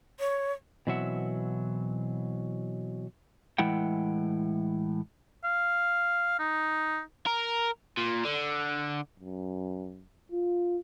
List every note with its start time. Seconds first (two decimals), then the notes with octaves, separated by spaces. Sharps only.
0.20 C#5
0.87 B2 E3 F#3 C4 E5 F#5
3.58 A2 E3 G#3 E4 F#5 G5
5.44 F5
6.39 D#4
7.27 A#4
7.98 A#2
8.25 D3
9.20 F#2
10.32 F4